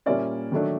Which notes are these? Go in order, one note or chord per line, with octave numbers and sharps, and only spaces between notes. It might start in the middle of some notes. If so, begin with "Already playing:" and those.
A#2 G3 A#3 C#4 D5 E5
D#3 F#3 A3 D4